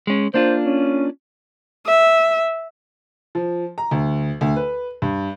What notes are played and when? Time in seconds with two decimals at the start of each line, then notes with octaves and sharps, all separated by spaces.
0.07 G#3 C#4
0.34 A#3 D4 F4 C5
0.65 C#4
1.86 E5
3.35 F3
3.78 A#5
3.91 D2
4.41 D2
4.56 B4
5.02 G2